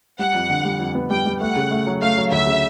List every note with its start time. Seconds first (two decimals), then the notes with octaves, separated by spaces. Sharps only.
0.19 G3 F#5
0.35 F2
0.50 D3
0.65 G3
0.79 F2
0.95 B3
1.10 G3 G5
1.26 G3
1.41 A3 F#5
1.56 C#3
1.71 A3
1.87 F#3
2.02 A3 F5
2.17 F#3
2.32 D2 E5
2.47 C#3